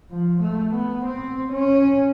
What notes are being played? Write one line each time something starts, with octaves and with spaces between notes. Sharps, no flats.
F3
A3
B3
C4
C#4